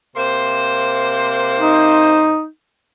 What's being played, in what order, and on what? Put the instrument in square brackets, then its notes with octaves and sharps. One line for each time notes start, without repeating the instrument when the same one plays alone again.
[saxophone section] C3 A#3 C5
[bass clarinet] D#4